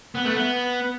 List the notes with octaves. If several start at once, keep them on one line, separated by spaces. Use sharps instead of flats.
B3
A3
B3